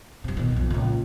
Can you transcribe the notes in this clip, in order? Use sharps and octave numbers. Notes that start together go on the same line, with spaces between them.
G2 C3
B2 D#3
B1 F2
C#2 A#2